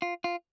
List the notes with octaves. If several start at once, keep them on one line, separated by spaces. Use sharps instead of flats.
F4
F4